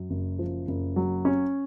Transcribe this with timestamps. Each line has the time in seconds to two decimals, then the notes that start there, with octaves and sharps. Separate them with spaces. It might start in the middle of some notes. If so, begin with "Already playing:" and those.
Already playing: F#2
0.10 F#1
0.39 F3
0.68 F#1
0.96 F#3
1.25 C#4